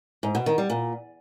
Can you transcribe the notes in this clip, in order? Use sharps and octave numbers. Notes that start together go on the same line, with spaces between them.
G#2
B2
D#3
G3
A#2